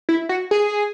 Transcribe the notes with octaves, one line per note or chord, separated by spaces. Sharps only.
E4
F#4
G#4